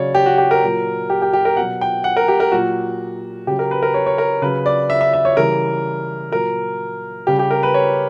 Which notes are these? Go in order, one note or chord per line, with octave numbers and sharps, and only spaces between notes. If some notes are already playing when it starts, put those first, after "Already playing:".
Already playing: C#3 F#3 C#5 D5
G4
F#4
G4
A#4
A#2 F#3
G4
G4
G4
A#4
B2 F#3 F#5
G5
F#5
A#4
G4
A#4
A#2 F#3 F#4
C#3 F#3 G4
A#4
B4
A#4
C#5
C#5
A#4
C#3 F#3 B4
D5
E5
E5
E5
C#5
C#3 E3 G3 A#4
A#2 F#3 A#4
C#3 G3 G4
G4
A#4
B4
C#5